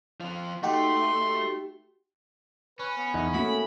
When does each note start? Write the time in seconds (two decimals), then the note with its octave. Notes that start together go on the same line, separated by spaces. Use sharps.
0.20 F3 C4
0.63 A3 D#4 F#4 G4 C6
2.79 C#4 B4
2.98 B3
3.14 E2 D#4 F#5
3.34 A3 A#3 C#4 E4 F#4 B5